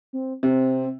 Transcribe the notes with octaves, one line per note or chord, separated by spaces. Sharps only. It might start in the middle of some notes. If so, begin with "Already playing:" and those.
C4
C3 C4